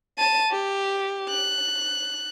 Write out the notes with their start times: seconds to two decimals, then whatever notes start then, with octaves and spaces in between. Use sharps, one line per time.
0.18 A5 D#7
0.51 G4
1.29 F#6